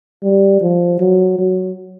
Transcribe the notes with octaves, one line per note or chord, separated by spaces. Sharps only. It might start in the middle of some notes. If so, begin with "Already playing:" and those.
G3
F3
F#3
F#3